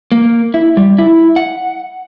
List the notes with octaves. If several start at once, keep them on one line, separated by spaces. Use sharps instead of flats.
A#3
E4
G3
E4
F#5